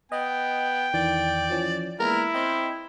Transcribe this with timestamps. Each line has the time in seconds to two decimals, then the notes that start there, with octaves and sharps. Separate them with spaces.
0.12 B3 D#5 G5
0.94 E2 D#3 E3 D5
1.50 E3 F3 C#4
2.00 G#3 A#3 B3 E4 A#4
2.34 C4 D#5 G5